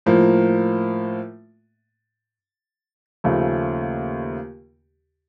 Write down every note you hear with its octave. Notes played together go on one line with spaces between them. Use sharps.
A2 F3 A#3
D#2 C#3 F3 A3